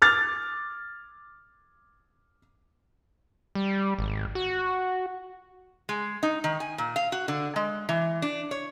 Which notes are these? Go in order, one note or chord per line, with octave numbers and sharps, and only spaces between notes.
D6 F6 A6
G3
G#1
F#4
G#3
D#4
D#3
G#5
A#2
F5
F#4
D3
G#3
E3
D4
C#5